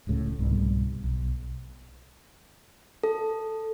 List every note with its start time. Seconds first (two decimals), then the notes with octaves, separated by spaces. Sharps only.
0.07 D1 C#2 A2 C#3
0.39 C2 G#2 B2 G3
1.04 B1
3.04 A4